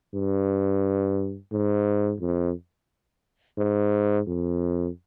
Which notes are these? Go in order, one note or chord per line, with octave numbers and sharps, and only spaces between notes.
G2
G#2
F2
G#2
F2